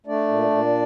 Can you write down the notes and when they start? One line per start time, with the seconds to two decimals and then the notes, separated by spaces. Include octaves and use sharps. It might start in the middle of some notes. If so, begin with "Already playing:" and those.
0.06 A3 D4 D5
0.28 A#2
0.50 A#2